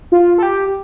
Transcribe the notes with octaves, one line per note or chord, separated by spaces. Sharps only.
F4
A4
G4